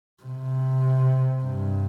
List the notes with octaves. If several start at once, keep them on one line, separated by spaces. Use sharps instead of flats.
C3
G2